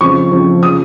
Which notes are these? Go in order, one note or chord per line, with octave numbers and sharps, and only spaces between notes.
F2 C#3 F3 C#6
F2 C#3 F3
C#3 F3 D#6